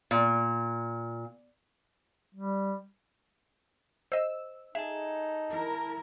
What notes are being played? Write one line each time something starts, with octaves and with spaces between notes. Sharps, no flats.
A#2
G3
C5 D#5 E6
D#4 G#4 A4 E5
E4 A#4